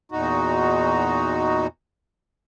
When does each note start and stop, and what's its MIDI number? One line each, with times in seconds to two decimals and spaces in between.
0.12 1.67 40
0.12 1.67 46
0.12 1.67 63
0.12 1.67 66